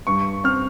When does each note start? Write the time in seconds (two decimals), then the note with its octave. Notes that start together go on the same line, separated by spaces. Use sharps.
0.07 G2 C#6
0.44 C4 F6